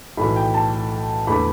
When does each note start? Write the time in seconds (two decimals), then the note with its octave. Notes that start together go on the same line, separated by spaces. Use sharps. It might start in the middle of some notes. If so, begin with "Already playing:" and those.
0.17 B1 A2 E3 A3 B5
0.36 G5
0.54 A5
1.27 E2 D3 A3 B5